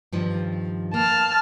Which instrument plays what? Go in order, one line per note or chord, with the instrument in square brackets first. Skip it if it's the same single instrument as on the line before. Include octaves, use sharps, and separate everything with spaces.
[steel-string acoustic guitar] G2 D#3 F3
[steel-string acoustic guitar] A#3 [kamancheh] A5 F6